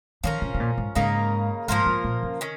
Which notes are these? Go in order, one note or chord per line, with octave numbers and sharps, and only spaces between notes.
D#3 F3 C#4 A#4
C#3
C#3
A#2
G#2
G#2 C#3 A#3 D#4 A#4
G#2 F3 A#3 F4 A#4
G#2
A#2
C#3
D#3 C#4